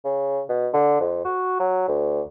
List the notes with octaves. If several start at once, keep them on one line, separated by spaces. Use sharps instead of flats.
C#3
B2
D3
F2
F#4
F#3
D2